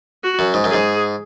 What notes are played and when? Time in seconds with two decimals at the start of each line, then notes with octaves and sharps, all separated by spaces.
0.23 F#4
0.39 F#2
0.54 G#2
0.64 F#2
0.70 G#2 G#4